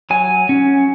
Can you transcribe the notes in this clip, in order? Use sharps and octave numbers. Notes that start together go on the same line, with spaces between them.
F#3 G#5
C#4